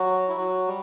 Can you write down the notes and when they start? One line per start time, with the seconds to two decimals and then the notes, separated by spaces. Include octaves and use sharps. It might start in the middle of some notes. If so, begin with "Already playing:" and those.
Already playing: F#3 F#4
0.28 E4
0.37 F#3 F#4
0.67 G3